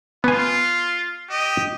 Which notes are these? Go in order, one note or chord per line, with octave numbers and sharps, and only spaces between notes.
B3 F4 G#5
G4 D#5